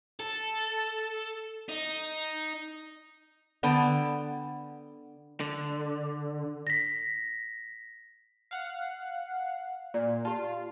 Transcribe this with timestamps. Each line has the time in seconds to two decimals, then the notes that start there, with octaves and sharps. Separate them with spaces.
0.20 A4
1.69 D#4
3.63 D3 B3 G5 A5
5.40 D3
6.67 A#6 B6
8.51 F5 F#5
9.94 A#2 D5
10.25 F4 G4 A5